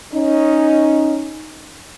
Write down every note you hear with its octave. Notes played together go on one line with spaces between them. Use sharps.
C#4 D#4